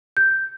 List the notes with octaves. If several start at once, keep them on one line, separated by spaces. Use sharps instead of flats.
G6